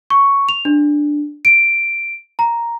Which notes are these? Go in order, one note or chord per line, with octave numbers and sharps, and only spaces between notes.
C#6
F7
D4
D7
A#5